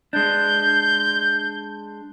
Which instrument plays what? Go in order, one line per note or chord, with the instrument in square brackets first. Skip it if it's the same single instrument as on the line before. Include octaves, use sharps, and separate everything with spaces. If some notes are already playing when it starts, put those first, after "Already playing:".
[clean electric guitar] G#3 D4 [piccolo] G6